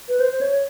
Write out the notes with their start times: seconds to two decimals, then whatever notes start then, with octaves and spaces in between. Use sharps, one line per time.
0.09 B4
0.20 C5
0.33 C5
0.41 C#5